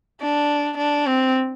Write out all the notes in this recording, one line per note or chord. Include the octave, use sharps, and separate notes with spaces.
D4
D4
C4